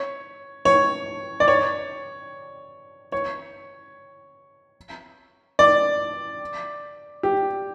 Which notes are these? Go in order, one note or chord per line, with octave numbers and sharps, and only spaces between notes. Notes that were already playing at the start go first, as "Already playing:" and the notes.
Already playing: C#5
C#5
D5
C#5
C#5
D5
G4